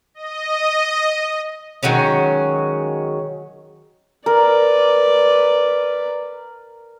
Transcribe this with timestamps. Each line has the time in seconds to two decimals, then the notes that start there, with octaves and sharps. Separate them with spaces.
0.14 D#5
1.83 D#3 F#3 G#3 C#4
4.26 A#4 B4 D5